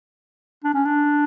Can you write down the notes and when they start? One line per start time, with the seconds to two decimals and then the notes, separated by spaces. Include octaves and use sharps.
0.64 D4
0.74 C#4
0.85 D4